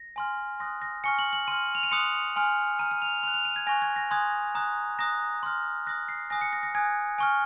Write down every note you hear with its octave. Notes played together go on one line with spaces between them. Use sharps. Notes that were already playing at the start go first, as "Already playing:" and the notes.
Already playing: A#6
G#5 C6 F6
C6 D#6 F#6 A#6
A#6
G#5 C#6 F6 C#7
F#7
F#7
C6 F6 D#7
F7
D#7
C6 D#6 F#6 C#7
G#5 C6 F6
A#5 F6 D#7
D#7
F7
C6 F#6 F7
F7
D#7
G#6
G#5 C#6 F#6 A#6
G#6
A#6
G#5 C6 D#6 F#6 G#6
A#5 D#6 F#6
A#5 D#6 F#6 A#6
C6 F6
C6 D#6 F#6 A#6
C7
G#5 D#6 F#6 A#6
C#7
A#6
A#6
G#5 D#6 F#6 G#6
G#5 C#6 F6